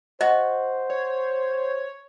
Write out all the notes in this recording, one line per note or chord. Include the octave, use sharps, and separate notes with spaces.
F#4 C5 D#5
C#5